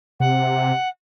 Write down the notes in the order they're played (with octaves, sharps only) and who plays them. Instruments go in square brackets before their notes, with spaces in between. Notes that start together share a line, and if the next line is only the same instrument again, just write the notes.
[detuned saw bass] C3 [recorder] F#5